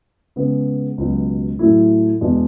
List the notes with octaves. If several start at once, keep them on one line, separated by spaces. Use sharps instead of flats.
C#3 G#3 B3
C#2 B2 F#3
A2 F#3 A3 E4
E2 B2 G#3 D4